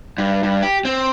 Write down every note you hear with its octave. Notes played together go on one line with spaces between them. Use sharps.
G2
G2
G4
C4